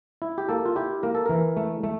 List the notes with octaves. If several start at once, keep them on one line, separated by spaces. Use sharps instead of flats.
E4
G4
A#3 A4
F4
E4 G4
A#3 A#4
A4
E3 A#4
A3
A3